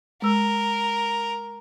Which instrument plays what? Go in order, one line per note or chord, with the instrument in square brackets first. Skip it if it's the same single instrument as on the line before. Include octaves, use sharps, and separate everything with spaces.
[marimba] G#3 E6 [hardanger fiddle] A#4